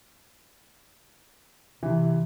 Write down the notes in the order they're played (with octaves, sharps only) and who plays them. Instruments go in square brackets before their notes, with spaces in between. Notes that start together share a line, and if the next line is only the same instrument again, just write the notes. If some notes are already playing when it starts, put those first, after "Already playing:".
[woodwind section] C3 [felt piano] E3